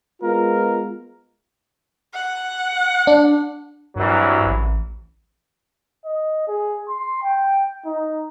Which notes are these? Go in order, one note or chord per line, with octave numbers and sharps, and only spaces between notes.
G#3 B3 F4 A#4
F#5
D4
C2 G2 E3 F#3
A1
D#5
G#4
C6
G5
D#4